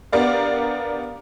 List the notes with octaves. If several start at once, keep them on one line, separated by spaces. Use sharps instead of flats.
B3 D4 G4 A#4 D5 F5